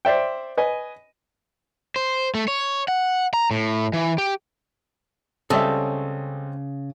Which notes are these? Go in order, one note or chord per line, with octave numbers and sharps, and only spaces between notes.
C5 D5 E5 G5
B4 D#5 G#5
C5
A3
C#5
F#5
A#5
A2
E3
G4
C#2 C#3 G3 C4 C#4 A4 D#5 E5